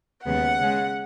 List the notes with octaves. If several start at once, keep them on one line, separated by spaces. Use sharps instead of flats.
D#2 C#3 G#3 B3 F#5
C#3 G#3 C#4